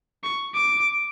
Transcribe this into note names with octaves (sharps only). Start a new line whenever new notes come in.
C#6
D6